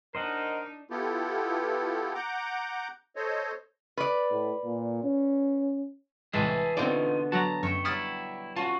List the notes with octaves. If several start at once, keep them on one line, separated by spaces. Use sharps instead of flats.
D4 D#4 A#4 C5 D#5 F#5
B3 E4 F4 G4 A4
F#5 A#5 D6 G6
A4 C5 C#5 D#5
B4 D5
A2
A#2
C#4
C2 A2 E3 G#3 G#4 E5 A5
B2 D3 C4 D#4 F4 C5 D5
F#3 F#4 A5 A#5
F#2 C#5 E5 G5
F#3 G3 E4 G4 D#6 F6 A6
C#4 F4 F#4 A5